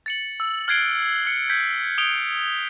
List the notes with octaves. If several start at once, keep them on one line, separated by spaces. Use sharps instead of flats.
A6 C#7 F#7
E6
F6 F#6 G#6 C7 D7 G7
F6 C#7
G6 G#6 B6
D#6 D7 F7 G7